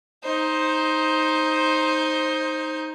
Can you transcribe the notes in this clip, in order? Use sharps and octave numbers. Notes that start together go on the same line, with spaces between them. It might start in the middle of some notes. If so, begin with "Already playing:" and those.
D#4 C5